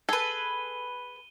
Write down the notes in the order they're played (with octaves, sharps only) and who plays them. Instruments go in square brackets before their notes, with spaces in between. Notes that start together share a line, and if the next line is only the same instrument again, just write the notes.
[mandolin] G#4 B4 [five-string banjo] A4 [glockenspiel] D#7 G7